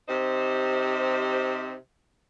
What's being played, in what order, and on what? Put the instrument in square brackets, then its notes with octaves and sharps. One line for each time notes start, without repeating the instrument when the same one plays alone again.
[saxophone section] C3 D#4 G4 C5